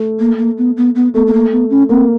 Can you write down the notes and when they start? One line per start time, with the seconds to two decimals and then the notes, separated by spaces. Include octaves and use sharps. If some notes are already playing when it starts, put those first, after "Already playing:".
Already playing: A3
0.20 A#3
0.38 A#3
0.58 B3
0.77 B3
0.95 B3
1.14 A3 B3
1.27 B3
1.33 A#3
1.52 B3
1.70 C#4
1.89 A#3 C4